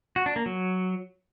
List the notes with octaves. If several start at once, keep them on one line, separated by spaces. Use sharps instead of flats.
F#4
D4
A#3
F#3